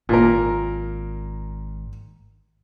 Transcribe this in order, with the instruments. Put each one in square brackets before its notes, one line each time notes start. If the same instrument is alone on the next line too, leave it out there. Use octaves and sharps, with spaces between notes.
[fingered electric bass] G#1 [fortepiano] A#2 A#4